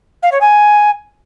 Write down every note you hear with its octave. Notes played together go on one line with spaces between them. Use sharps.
F5
C#5
G#5